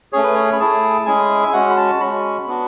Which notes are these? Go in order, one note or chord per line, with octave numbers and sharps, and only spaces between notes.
A3 C#4 G#4 C#5
B4
C#5
B5
A3 E4 G#4 A5
G#3 C#4 E4 G#4 G#5
E5
G#3 C#4 F#4 F#5
B5
A5
G#3 C#4 F#4 B5
B3 D4 F#4